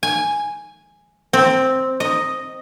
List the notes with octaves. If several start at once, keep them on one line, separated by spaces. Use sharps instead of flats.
G#5
C4
D#5